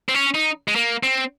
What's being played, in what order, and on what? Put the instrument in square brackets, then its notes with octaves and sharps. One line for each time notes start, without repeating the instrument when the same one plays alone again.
[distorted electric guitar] C4
C#4
D#4
G#3
A#3
C4